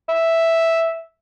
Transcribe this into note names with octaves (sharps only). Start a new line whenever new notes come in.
E5